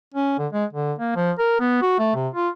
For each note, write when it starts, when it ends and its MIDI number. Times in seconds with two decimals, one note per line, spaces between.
0.14 0.35 61
0.39 0.47 50
0.52 0.65 56
0.73 0.93 50
0.98 1.14 58
1.16 1.31 53
1.39 1.59 70
1.60 1.78 59
1.82 1.98 66
1.99 2.12 57
2.15 2.28 48
2.34 2.49 65